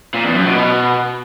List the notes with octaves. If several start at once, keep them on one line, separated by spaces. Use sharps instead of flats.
A#2
E2
F#2
B2
B2